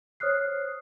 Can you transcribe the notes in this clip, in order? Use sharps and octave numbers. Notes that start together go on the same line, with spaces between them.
C5 C#5 D#6 F6 F#6 C7